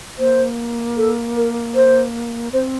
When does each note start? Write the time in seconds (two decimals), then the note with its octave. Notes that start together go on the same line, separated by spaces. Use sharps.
0.19 A#3 C5
0.97 A4
1.36 A#4
1.75 C5
2.52 C4 C5